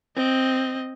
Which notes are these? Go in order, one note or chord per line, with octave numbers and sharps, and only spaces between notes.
C4 D#5